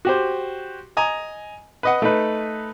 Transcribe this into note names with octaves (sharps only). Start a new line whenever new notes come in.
F#4 G4 C5
D#5 G#5 A#5
B4 D#5 F#5
A3 D#4 B4